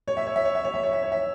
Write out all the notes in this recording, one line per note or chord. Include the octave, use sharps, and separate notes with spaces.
C#5
E5
C#5
E5
C#5
E5
C#5
E5
C#5
E5
C#5
E5